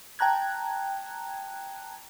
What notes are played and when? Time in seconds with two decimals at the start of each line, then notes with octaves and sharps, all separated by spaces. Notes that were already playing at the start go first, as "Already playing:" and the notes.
0.19 G5 A5 A#5 F#6 G#6